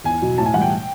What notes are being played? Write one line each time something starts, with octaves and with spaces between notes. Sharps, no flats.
E2 G#5
B2 F#3
A2 A5
G#5
E3 G3 F#5
G5